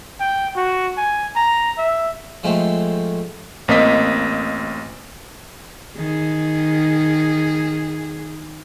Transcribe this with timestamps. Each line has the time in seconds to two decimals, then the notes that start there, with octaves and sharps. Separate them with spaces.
0.20 G5
0.56 F#4
0.97 G#5
1.36 A#5
1.78 E5
2.43 F3 G#3 A3 C4
3.68 A1 A#3 C4 D#5 B6
5.97 D#3 G#4